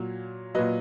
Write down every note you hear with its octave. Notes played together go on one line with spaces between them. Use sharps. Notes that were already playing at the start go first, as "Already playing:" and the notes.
Already playing: A#2 F#3
A#2 F#3 B4 D#5